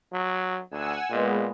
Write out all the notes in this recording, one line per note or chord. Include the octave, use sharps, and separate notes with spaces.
F#3
D2 F#5 G#5 E6
A#2 G#3 B3